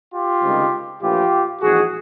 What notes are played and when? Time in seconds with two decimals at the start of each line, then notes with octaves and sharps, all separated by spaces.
0.13 F4 G4
0.42 C#2 C3 D#3 G3
1.01 A#1 A2 E3 F4 G4
1.61 A#1 G#2 E3 F#4 G#4